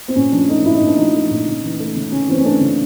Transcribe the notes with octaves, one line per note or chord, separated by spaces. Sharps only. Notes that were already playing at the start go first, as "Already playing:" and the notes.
C4
A#2 C#4
F3 D4
A3 D#4
A#2 E4
D#4
A#2 D4
F3 D#4
A3
A#2
C#3
E3
A3
C#3
C#3 C#4
E3 C4
C#4
A3 D4
C#3